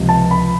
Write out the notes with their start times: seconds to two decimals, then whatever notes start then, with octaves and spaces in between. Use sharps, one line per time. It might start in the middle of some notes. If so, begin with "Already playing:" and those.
Already playing: C#2 C3 F3
0.09 A5
0.31 B5